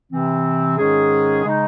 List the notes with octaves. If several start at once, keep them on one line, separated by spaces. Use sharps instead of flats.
C3 E3 C4
G#2 D#3 G#3 C#4 G#4
C#3 G#3 D#4